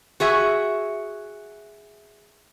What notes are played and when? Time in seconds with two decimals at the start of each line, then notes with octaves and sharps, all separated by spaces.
0.20 F#4 G#4 E5